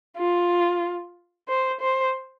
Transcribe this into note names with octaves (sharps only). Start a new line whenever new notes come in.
F4
C5
C5